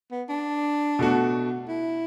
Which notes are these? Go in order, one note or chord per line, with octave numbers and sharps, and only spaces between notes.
B3
D4
B2 A3 F#4
E4